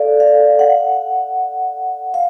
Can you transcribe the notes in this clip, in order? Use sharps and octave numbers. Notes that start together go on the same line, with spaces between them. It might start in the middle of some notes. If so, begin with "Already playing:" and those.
Already playing: A4 D5 F5
F5
F#5
F5